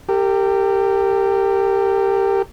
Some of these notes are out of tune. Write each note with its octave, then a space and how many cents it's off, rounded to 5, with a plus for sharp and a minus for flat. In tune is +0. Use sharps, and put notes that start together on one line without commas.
G4 +0 A#4 -40